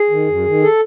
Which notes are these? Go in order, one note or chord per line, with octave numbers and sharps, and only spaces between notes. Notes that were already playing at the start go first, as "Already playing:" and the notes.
Already playing: G#4
D#3
F#2
D#3
A4